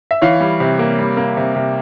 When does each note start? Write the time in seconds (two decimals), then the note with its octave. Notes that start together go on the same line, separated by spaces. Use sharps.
0.11 E5
0.22 E3 C#5 F5
0.40 G3
0.60 C3
0.79 A#3
0.99 G3
1.17 A#3
1.37 C3
1.56 C3